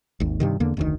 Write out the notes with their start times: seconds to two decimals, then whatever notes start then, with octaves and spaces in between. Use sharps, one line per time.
0.20 G#1 D#2
0.40 G2 C3 D#3
0.60 E2 D3 A#3
0.77 F1 D2 D#3